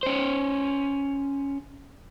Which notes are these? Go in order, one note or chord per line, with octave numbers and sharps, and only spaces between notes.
C#4 C5